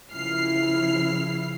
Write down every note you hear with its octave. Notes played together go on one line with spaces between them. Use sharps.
C#3 F3 E4 F6 C7